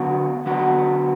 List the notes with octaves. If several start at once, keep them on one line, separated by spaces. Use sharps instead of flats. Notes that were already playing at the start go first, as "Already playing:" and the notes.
Already playing: D3 F#3 B3 F#4
D3 F#3 B3 F#4